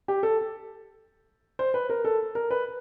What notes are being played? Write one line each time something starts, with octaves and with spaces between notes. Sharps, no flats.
G4
A4
C5
B4
A#4
A4
A#4
B4